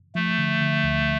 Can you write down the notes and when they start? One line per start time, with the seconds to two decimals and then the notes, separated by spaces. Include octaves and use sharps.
0.15 F3 A3
0.38 D3
0.61 D3
0.84 D2